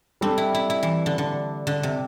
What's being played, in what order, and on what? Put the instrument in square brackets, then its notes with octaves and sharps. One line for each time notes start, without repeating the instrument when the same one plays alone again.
[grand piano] G3 D4 A4 [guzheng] C4
[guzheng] E4
E4
E4
E3
D3
D3
D3
C3